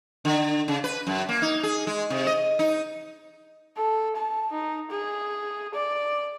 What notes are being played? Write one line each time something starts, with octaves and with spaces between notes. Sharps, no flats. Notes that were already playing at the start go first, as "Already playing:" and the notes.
D3
C#3
B4
F#2
A#3
D#4
G#4
G#3
C3
D#5
D#4
A4
A5
D#4
G#4
D5